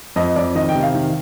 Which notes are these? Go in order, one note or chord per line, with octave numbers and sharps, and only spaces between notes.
F2 D#5
F2 D5
D#3 D#5
G5
C3
F5
D#3